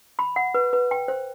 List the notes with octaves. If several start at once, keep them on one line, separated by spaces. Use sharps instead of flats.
B5
F#5
B4
B4
G5
C5